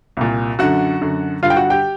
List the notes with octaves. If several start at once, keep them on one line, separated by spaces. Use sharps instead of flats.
C2 A#2
F#2 D3 F#4 F#5
F#2 D3
G2 D3 F4 F5
G5
F#4 F#5
G4 G5